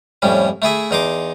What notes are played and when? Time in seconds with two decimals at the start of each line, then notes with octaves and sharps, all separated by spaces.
0.22 F2 A2 G3 C#4
0.62 A3 E4 G#4 E5
0.91 E2 D#4 C6 D6